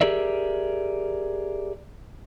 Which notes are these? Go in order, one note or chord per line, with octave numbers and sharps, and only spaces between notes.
G4 G#4 A#4 D5 E5